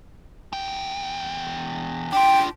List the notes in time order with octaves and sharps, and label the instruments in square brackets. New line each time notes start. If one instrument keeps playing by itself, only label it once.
[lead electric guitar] E2 G5
[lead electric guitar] D4 F4 [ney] G5